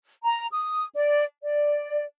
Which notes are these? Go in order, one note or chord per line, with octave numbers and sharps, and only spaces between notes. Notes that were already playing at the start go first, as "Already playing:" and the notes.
A#5
D#6
D5
D5